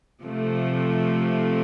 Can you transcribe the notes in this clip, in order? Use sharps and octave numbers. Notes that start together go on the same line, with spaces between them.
C3 F3 A3